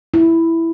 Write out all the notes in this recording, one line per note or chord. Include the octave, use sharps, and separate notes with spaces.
E4